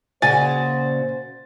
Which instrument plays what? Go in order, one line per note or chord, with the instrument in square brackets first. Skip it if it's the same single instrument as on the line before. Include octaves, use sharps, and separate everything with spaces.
[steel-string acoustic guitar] A#2 C#3 F#4 [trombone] C5 [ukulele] G#5 [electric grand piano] A6